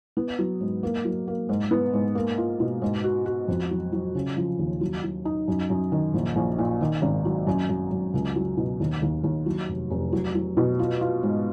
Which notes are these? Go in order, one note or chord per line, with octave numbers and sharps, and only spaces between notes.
B3
F#3
G#2
A#3
F#3
A#3
G#2
B3
G#2
A#3
F4
B2
G#2
F#4
F#4
F2
F#3
F#3
C#3
F3
D#2
F#3
F#3
D#4
F#2
F#2
D#3
A#1
A#1
A#2
D#3
G#1
F#3
F#2
F#2
F#2
C#2
F#3
B2
D#2
D#2
D#2
F#3
F1
F1
F#3
F#3
B2
F4
F4
G#2